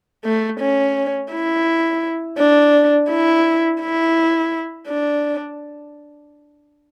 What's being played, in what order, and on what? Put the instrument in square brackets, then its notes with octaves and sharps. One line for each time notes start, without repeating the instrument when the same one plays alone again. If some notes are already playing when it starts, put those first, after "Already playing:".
[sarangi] A3
C#4
E4
D4
E4
E4
D4